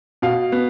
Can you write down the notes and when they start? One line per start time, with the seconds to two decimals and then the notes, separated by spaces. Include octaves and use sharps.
0.22 B2 F5
0.52 B3